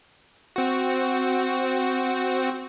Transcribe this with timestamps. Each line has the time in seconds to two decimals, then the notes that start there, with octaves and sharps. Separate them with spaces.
0.56 C4 F#4